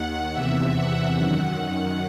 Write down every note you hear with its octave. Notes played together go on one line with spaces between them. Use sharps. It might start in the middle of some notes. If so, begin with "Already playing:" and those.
Already playing: D#2 D#3 F#5
E2 C3 E3 E5
F#5
F#2 D#3